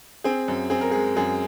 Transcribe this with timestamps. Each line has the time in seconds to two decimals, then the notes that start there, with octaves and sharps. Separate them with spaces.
0.24 C4 G#4
0.48 F#2
0.70 C4 G#4
0.81 A#4
0.91 G#3 G#4
1.17 F#2 G#4